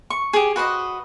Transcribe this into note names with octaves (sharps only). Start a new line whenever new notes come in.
C#6
G4 G#4
F#4 B4 C5 D#5